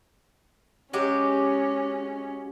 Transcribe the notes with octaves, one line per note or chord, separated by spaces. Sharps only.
F#3 G#3 C#4 G4